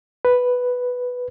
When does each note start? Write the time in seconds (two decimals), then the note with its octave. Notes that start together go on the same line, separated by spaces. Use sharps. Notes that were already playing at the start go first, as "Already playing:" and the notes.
0.25 B4